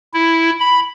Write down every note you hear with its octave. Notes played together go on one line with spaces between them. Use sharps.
E4
B5